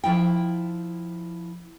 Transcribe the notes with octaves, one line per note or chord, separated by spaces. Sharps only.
F3 E4 G5